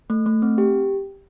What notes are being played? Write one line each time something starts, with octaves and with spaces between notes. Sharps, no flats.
A3
A3
C4
G4